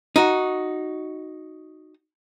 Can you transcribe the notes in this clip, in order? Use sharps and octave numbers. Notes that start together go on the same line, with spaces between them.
D#4 F#4